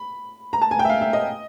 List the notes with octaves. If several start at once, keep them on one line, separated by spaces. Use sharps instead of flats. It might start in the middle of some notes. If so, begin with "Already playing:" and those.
Already playing: B5
A#5
A5
G#5
G5
E5
F5
E5
D#5